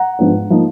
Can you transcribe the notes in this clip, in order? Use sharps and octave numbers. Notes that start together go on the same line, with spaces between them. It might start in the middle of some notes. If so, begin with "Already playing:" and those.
Already playing: F#5 A#5
G#2 F3 B3 D4
F3 A#3 D#4